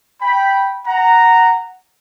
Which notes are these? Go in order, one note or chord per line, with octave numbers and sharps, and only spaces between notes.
G5 B5
F#5 A#5